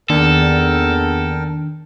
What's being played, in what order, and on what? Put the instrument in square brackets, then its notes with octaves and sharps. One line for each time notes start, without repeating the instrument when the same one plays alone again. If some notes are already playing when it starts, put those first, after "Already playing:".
[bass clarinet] E2 [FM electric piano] D#3 A#3 D4 [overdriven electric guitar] A4 [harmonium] A#4 G5